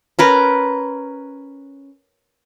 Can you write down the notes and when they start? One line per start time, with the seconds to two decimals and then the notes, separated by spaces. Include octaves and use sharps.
0.19 C#4 A#4 B4